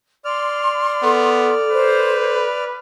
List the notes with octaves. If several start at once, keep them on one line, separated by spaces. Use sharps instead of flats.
D5 C6 F6
B3 A4
B4 C5